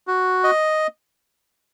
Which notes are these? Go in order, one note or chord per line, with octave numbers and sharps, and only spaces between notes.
F#4
D#5